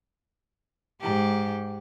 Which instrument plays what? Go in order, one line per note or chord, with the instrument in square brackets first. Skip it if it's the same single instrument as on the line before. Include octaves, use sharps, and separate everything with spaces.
[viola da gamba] G#2 G4